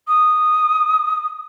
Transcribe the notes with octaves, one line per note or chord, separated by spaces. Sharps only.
D#6